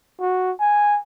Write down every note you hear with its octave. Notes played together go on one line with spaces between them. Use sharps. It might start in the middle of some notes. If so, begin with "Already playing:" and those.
F#4
G#5